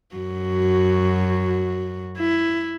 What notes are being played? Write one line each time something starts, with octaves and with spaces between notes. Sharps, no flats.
F#2 F#4
E4